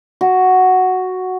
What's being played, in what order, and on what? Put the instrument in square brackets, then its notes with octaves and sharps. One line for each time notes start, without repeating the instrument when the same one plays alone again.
[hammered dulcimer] F#4